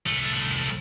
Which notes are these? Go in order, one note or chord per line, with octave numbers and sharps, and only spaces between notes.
C2 A3